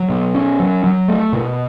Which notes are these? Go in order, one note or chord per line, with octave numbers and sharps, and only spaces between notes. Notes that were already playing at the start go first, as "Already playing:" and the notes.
Already playing: F#3
B2
C#4
F#3
F#3
A3
B2